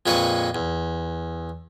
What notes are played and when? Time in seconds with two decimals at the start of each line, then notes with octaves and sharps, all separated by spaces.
0.06 F2 A#2 G#3 B4 C#6
0.55 E2